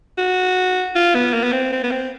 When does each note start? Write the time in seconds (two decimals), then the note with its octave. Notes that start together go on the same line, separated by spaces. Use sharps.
0.18 F#4
0.96 F4
1.15 B3
1.34 A#3
1.44 B3
1.52 C4
1.73 C4
1.84 B3
1.91 C4